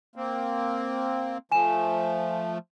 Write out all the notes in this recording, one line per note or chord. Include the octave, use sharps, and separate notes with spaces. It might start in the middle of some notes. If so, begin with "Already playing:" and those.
A#3 C4
F3 A3 G#5 E7